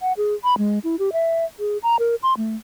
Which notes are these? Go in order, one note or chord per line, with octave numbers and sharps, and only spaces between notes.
F#5
G#4
B5
G#3
E4
G4
E5
G#4
A#5
A#4
C6
A3